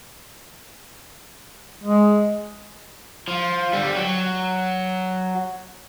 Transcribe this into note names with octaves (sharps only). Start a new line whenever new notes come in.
G#3
F3
D3 G3
F#3